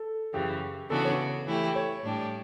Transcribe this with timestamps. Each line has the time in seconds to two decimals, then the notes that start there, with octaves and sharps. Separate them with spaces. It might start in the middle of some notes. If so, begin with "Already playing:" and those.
Already playing: A4
0.34 F#2 C#3 E3 G4
0.90 C#3 E3 B3 D4 F#4 A4
1.05 C#5
1.47 E3 A3 E4 G4
1.75 C#5
2.04 A2 G3 D4 G4